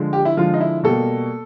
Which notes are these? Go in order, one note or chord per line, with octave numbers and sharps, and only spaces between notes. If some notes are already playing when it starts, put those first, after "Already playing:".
Already playing: D3 F3 G#3
G4
E4
D3 F3 G#3 F4
D#4
E4
B2 G3 A#3 A4